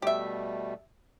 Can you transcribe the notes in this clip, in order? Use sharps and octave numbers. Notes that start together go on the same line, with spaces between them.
B2 G3 A3 G4 E5